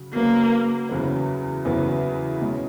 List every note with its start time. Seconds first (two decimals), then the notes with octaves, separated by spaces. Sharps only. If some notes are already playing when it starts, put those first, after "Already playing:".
Already playing: C#3 F#3
0.13 C#3 F#3 A#3 B3
0.89 E2 C#3 F#3 B3
1.65 E2 C#3 F#3 B3
2.41 B2 G#3 C#4